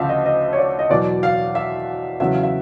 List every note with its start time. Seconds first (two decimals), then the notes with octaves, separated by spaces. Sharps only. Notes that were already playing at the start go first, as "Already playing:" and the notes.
Already playing: D2 C#3 F3 A3 E5 F5
0.09 D#5
0.26 D#5
0.53 C#5
0.58 D5
0.79 D#5
0.89 E2 B2 F#3 D5
1.23 F5
1.55 E5
2.20 E2 C#3 F#3 E5
2.34 F5
2.43 E5